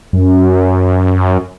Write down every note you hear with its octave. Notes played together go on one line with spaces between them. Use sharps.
F#2